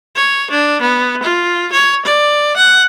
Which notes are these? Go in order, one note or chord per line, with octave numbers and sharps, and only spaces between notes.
C#5
D4
B3
F4
C#5
D5
F#5